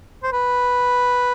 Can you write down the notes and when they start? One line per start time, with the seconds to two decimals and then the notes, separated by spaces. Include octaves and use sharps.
0.23 C5
0.32 B4